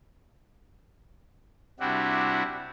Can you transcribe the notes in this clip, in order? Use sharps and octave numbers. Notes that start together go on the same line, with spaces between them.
C3 G3 D4 E4 F#4